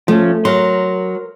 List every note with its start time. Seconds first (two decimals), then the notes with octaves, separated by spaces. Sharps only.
0.08 F3 A3 C#4
0.45 F#3 A#4 C6